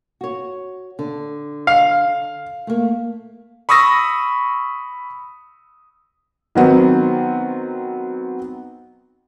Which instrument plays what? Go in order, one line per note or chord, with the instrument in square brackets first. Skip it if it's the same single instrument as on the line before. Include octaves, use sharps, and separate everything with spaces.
[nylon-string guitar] F#4 C#5
D3
[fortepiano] F5
[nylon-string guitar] A3 A#3
[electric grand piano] B5 C#6 D#6 E6 A#6
[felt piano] D#3 F#3 B3 C4